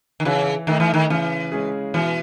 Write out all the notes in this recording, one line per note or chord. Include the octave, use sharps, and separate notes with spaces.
D#3
C#3 E3
D#3 A3 D#4
E3
D#3
C#3 E3
G#3 C#4 G#4
B2 E3